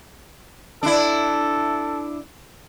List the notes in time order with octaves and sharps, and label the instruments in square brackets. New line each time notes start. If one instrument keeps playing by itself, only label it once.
[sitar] D4 E4 [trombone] A4